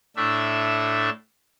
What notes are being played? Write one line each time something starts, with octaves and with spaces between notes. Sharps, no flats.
A2 A3 D4 E5